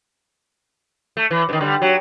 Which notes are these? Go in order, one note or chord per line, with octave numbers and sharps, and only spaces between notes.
A3
E3
G2 D#3
D3 G3
F#3